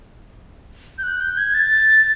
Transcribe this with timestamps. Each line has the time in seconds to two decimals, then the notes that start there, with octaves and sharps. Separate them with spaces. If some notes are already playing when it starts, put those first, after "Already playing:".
0.98 G6
1.03 F#6
1.20 G6
1.38 G#6
1.54 A6